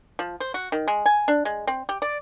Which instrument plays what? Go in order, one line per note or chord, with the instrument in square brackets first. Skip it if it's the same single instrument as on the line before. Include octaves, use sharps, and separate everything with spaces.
[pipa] F3
C5
F#4
D#3
G#3
G#5
D4
G#3
C4
G4
D5